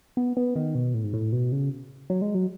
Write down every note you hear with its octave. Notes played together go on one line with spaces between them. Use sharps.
B3
B3
D#3
B2
A2
G#2
A2
B2
C#3
F#3
G#3
F#3